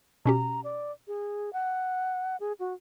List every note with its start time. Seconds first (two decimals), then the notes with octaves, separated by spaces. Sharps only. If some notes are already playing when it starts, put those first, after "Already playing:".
0.25 B2 C#4 G4 A#5
0.64 D5
1.07 G#4
1.53 F#5
2.40 G#4
2.59 F#4